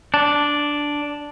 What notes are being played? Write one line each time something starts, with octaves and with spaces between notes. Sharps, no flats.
D4